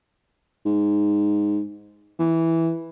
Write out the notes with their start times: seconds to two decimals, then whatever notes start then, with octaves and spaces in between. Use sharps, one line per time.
0.65 G#2
2.19 E3